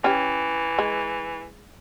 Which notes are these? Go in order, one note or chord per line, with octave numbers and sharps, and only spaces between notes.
E3 C#4 G4
G#3